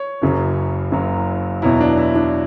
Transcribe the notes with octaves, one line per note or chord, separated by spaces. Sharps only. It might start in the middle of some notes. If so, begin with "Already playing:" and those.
Already playing: C#5
F#1 F#2 C#3 F#3
F#1 F#2 C#3 F#3
E2 B2 F#3 E4
D4
E4
D4